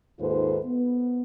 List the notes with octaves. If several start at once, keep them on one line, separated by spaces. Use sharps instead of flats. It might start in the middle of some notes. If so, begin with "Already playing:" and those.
D#2 G#2 F4 A4 B4 C5
B3